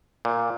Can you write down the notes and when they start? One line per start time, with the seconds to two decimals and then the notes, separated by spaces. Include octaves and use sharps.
0.25 A#2